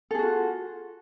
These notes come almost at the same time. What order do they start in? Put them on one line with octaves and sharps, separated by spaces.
A4 G#4 F#4 F4